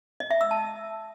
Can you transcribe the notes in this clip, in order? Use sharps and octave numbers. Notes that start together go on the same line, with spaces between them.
D#5
E5
E6
A5